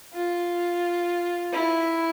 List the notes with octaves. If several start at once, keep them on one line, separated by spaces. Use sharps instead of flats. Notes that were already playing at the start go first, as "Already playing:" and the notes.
F4
E4